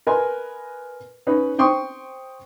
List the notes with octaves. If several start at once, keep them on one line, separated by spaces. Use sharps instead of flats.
A#4 B4 D#5 G#5 A#5 C6
C#4 D#4 B4
C5 G5 C6 C#6 D#6